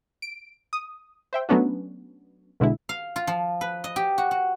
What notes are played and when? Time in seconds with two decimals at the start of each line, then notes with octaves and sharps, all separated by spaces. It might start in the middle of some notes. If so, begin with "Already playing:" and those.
0.22 D7
0.73 D#6
1.33 C5 E5 G5
1.49 F#3 A3 B3 C#4 D4 F#4
2.60 B1 B2 D3 G#3 E4
2.89 F5
3.16 F4
3.27 F3
3.61 B4
3.84 D#5
3.96 G4
4.18 F#4
4.31 F#4